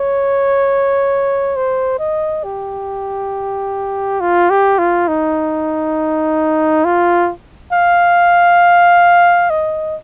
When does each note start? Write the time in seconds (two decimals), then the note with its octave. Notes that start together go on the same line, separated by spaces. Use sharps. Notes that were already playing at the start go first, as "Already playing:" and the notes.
Already playing: C#5
1.56 C5
1.99 D#5
2.44 G4
4.20 F4
4.50 G4
4.79 F4
5.08 D#4
6.85 F4
7.73 F5
9.50 D#5